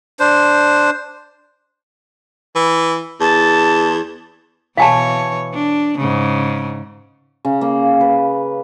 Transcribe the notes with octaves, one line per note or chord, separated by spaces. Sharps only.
D4 C5
E3
E2 A5
B2 E3 C#5 F5 G#5 A5
D4
G#2 C#3
C#3
A#3
B4